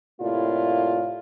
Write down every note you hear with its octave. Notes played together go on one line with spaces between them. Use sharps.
A2 C3 A#3 E4 F4 D5